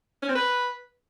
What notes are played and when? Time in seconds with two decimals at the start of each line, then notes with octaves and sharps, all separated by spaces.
0.23 C#4
0.29 C4
0.35 B4